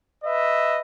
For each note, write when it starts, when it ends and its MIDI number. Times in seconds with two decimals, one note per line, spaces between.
0.24 0.82 71
0.24 0.82 75
0.24 0.82 76